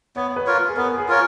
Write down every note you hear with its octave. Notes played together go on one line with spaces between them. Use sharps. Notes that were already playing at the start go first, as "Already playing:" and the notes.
B3 C#5
B4
F4 A#4 C#5
G#4
B3 A#4
G#4
F4 A#4 C#5